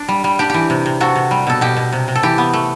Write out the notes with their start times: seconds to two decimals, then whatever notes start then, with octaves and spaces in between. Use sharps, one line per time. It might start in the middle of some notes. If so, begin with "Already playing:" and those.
Already playing: D4
0.08 G3
0.24 G3
0.39 D4 G4
0.50 E3 G4
0.70 C3
0.86 C3
1.00 C3 F#4 A4
1.16 C3
1.31 G3
1.47 B2 A4
1.61 B2 G4
1.77 B2
1.92 C3
2.08 C3
2.15 A4
2.23 E3 G4
2.38 B3
2.53 A3